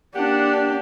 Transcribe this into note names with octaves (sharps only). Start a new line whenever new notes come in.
A#3 D4 G4 F#5